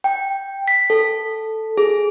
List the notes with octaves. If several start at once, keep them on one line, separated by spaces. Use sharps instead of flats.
G5
B6
A4
G#4